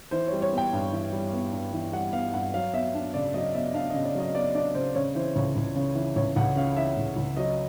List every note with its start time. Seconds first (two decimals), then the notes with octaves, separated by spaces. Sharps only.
0.11 E3 C5
0.27 G3 C#5
0.42 C#5
0.52 B3
0.58 G5
0.73 G2
0.92 E3
1.12 G3
1.33 B3
1.52 G2
1.73 E3
1.93 G3 F#5
2.13 B3 F5
2.33 G2 F#5
2.54 F#3 F5
2.73 B3 E5
2.94 D4
3.14 C#3 D5
3.34 F#3 D#5
3.54 B3 E5
3.74 D4 F5
3.90 C#3 D#5
4.05 D5
4.15 F#3 D#5
4.35 B3 D5
4.55 D4 D5
4.75 C#3 C5
4.95 C#3 C#5
5.15 E3 C5
5.36 C#2 C#5
5.56 C#2
5.76 C#3
5.96 E3
6.16 C#2 C#5
6.36 C#2 F#5
6.56 C#3 F5
6.77 E3 E5
6.97 C#2
7.16 C#2
7.37 F#3 D#5